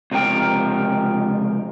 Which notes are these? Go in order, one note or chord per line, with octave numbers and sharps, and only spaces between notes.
C#2 C3 F3 A#4 G5